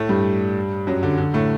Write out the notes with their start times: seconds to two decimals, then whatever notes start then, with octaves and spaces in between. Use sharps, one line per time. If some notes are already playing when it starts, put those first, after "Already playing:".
Already playing: A2 A3
0.09 G2 G3
0.87 F#2 F#3
1.03 D3
1.18 D3
1.34 A2 A3